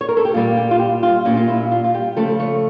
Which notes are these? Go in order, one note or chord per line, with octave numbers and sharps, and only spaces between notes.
C#5
A#4
A4
G4
A#2 G3 A#3 F4
G4
F4
G4
F4
A#2 G3 A#3 C#4
F4
E4
F4
F4
G4
C#3 F3 A3 A4
C#5